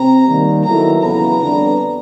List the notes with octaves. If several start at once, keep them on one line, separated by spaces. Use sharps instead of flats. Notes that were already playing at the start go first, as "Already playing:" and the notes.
Already playing: C3 C4 A#5
D#3 G3 A#3
D#3 F#3 B3 E4 A4 A#5
E2 C#3 F#3 B3 E4 A#5
F2 D3 G3 B3 D4